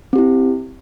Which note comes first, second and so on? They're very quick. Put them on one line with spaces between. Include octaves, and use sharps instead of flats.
C4 G4 E4